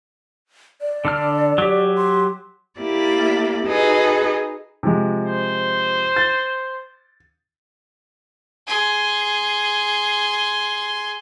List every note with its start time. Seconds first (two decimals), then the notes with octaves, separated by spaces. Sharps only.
0.81 D5
1.05 D3 D4 F6
1.58 F#3 G4
1.97 C6
2.80 A#3 E4 G4 D5
3.68 D#4 F#4 G#4 A4 B4
4.83 C3 F3 G#3
5.25 C5
6.16 A6
8.67 G#4 C6